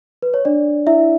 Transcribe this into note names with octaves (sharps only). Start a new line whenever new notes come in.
B4
C#5
D4 D5
E4 E5